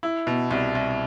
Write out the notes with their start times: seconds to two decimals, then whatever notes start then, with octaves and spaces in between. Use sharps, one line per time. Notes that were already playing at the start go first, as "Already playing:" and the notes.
0.03 E4
0.27 B2
0.51 C2
0.75 C2